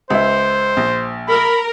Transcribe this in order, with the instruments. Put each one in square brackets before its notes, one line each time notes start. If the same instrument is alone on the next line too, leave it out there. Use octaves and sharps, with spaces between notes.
[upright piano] C#2 E5 [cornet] C5
[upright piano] A#1
[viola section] A#4 [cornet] B5